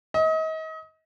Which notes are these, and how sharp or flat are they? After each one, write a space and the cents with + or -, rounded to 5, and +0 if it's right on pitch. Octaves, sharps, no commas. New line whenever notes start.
D#5 +35